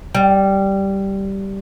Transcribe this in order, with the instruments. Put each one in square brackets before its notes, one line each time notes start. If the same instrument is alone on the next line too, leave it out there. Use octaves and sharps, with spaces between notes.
[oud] G3